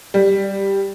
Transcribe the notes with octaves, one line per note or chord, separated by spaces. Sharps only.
G3